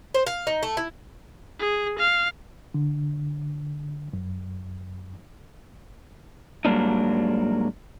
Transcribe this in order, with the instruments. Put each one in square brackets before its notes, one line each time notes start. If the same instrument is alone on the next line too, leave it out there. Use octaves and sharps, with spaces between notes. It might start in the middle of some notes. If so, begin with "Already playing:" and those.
[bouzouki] C5
F5
D#4
A3
E4
[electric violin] G#4
F5
[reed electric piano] D3
F#2
[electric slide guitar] G#2 F#3 G3 A#3 D4 D#4